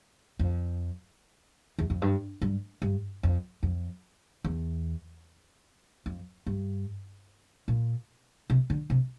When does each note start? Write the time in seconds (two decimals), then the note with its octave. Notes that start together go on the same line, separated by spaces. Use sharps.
0.39 F2
1.78 E2
1.90 F2
2.02 G2
2.42 G2
2.82 G2
3.23 F2
3.63 F2
4.45 E2
6.06 F2
6.46 G2
7.68 A#2
8.50 C3
8.70 D3
8.90 C3